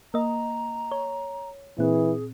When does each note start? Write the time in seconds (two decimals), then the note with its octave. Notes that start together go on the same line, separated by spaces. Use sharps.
0.14 A#3 D#5 A#5
0.91 C#5
1.78 A#2 E3 C4 G#4